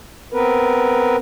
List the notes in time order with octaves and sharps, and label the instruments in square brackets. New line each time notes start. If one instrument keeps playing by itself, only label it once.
[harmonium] B3 C4 A#4 B4